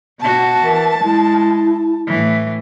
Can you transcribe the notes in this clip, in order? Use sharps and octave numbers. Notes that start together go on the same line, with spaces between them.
B2 F#4 A5
E3 A#4
G#3 E4
A2 E3